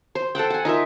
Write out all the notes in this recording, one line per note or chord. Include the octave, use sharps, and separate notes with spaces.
C5
A4 C5 F#5 G5
F#5 G#5
D#4 F4 A#4 E5